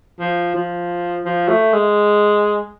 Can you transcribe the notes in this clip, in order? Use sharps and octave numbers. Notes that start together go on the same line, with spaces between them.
F3
F3
F3
A3
G#3